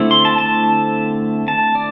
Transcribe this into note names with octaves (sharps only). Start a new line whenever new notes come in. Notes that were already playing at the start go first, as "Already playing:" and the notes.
Already playing: D3 A3 C4 E4
C6
A5
A5
A5
D5